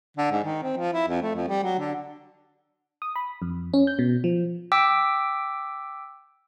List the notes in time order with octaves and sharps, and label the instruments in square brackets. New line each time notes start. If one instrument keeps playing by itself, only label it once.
[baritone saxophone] D3
G#2
D#3
C4
F3
E4
F2
A3
F2
G3
F#3
D3
[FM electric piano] D#6
B5
F2
C#4
G6
B2
F3
[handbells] G5 D6 E6 B6